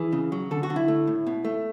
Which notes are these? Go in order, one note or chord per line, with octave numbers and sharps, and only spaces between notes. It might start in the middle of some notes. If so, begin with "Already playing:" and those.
Already playing: E3 G#4
C#3
F#3
D3 A4
F#4
D3
E4
A3
A2
B2
A3